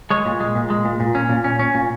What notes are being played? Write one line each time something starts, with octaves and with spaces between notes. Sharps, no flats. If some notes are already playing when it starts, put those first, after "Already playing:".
G#3 C#5
A#2
G#3
A#2
G#3
A#2
A#2
C#4
A#2
C#4
C#4
A#2